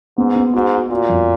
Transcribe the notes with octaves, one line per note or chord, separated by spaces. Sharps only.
G#2 B3
B3
G#2 F#4
F#4
A#2 F#4
F2